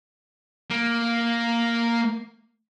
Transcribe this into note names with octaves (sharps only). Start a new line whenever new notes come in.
A#3